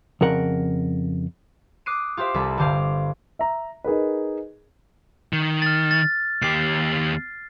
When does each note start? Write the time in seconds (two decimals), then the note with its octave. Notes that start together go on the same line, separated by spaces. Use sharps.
0.21 F2 C#3 A#4 F#5
1.86 D6 D#6 F#6 C7 D7 D#7
2.17 F4 G4 C5 E5
2.34 C2 A4 B5
2.57 G1 D3 G4 C5 F5
3.39 E5 A#5
3.84 D#4 G#4 A#4 B4
5.33 D#3
5.62 F6 A6
5.91 A6
6.42 D#2 G4 C7